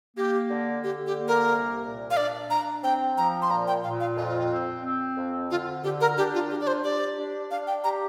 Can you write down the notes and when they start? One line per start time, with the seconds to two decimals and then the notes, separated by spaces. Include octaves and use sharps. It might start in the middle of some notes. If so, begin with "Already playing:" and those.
0.17 A#3 G4
0.50 D3
0.84 D3 G4
1.06 G4
1.17 A#3
1.28 A#4
1.50 C2
1.84 A#2
2.11 F5
2.17 D4 D5
2.50 D4 A#5
2.84 C4 G5
3.17 F3 A#5
3.42 C6
3.50 A#2 A#5
3.68 G5
3.84 A#2 F5
4.00 F5
4.17 F2 F4
4.51 C4
4.84 C4
5.17 F2
5.51 D3 F4
5.84 D3 G4
6.01 A#4
6.18 D4 G4
6.34 F4
6.50 D4 G4
6.61 D5
6.67 C5
6.84 G4 D5
7.17 D4
7.51 D4 F5
7.67 G5
7.84 G4 A#5